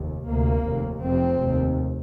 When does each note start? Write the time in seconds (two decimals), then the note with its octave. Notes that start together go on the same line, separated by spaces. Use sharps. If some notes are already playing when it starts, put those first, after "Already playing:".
Already playing: F1 D#2
0.26 D2 C3 A#3
0.65 F1 D#2
1.02 F1 F2 C3 C4
1.41 F1 D#2